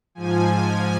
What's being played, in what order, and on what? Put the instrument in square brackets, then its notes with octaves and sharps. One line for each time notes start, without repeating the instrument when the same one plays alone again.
[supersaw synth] G#2 F3 G#5